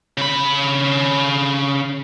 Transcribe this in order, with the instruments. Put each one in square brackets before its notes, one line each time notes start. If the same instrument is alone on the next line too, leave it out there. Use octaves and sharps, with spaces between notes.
[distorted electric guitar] C#3 B5